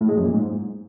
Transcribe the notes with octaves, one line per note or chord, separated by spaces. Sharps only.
A2
G#3
F#2
A#2
G#2